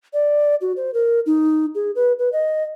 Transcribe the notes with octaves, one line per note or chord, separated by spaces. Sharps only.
D5
F#4
C5
A#4
D#4
G#4
B4
B4
D#5